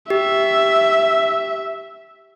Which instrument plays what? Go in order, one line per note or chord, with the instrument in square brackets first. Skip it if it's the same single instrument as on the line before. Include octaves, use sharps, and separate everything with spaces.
[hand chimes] G4 [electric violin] E5